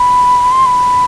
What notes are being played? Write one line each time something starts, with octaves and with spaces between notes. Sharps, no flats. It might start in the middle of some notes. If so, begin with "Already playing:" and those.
Already playing: B5
C6
B5